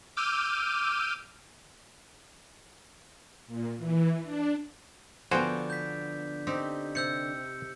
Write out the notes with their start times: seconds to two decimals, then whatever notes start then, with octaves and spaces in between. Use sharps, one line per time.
0.17 D6 E6 F6 G6 D#7
3.47 A#2
3.77 E3
4.23 D4
5.31 D3 F3 B3 F#4 C5 G5 G#5
5.70 G6 B6
6.47 C4 D#4 G4
6.95 C3 E6 G6 C#7